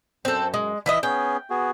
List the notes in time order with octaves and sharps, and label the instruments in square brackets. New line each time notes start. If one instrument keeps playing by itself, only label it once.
[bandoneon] F#2 [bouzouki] C4 A4
[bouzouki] G#3
E3 E4 D#5
[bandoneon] B3 C#4 G#4 [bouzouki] G5
[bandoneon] B3 F#4 G#4